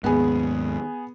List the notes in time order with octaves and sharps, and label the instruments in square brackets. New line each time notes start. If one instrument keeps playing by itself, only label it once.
[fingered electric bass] D#2 G#2 [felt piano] B3 G#4